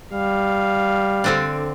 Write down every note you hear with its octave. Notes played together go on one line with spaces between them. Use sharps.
G3 F5
D3 C4 D4